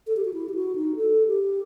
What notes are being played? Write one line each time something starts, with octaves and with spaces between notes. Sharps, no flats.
A4
G4
F#4
E4
G4
F#4
D#4
A4
G4